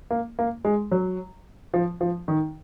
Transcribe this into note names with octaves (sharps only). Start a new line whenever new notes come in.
A#3
A#3
G#3
F#3
F3
F3
D#3